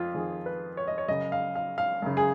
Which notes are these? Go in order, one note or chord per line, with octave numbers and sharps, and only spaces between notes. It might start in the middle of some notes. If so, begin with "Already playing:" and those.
Already playing: F2 F4
F2 D#3 G#4
B4
C#5
D#5
C#5
F#2 C#3 D#5
F5
F5
F5
F#2 C#3
G#4